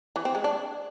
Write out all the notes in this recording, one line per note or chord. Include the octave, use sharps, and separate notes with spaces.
E3
C4
G#3
D4